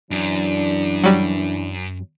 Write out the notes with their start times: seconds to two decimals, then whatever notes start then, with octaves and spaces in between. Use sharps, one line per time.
0.11 F#2 E3 D4
1.04 F#3 G3